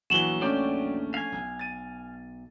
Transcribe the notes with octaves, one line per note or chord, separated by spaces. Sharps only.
A#1 E2 E3 F#3 F#4 E7 F#7 G7
F#3 A3 C#4 D4 D5 G5
F5 G#5
B1
A6 D#7